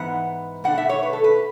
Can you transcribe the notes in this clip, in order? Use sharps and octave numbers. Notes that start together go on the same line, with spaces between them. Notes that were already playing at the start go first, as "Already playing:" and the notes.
Already playing: G#2 E3 B3 F#5
B2 A3 D4 F#5
E5
C#5
B4
A4
B4